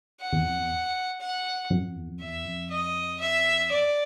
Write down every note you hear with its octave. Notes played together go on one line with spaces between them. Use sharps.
F#5
E2
F2
E2
F#5
F#2
F2
E2
F2
E2 E5
F2
D#5
E5
E2 D5